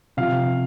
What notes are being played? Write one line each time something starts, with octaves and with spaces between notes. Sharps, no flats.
C3 F3 F5